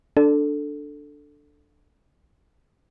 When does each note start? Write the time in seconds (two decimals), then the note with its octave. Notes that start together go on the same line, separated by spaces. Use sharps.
0.17 D4 A4